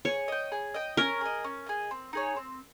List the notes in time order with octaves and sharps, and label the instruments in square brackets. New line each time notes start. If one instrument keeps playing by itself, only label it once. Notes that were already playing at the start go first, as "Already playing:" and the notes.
[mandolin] G#4 [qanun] C#5
[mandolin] D#5 G5
G#4
D#5 G5
[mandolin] C#4 [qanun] A#4
[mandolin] G#4 D#5
C#4
G#4 D#5
C4
D#4 G#4 C#5
C4